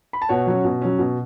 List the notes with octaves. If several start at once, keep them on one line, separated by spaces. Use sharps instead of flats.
B5
A5
B2 C#5 F#5
F#3 C#4
B2
F#3 C#4
B2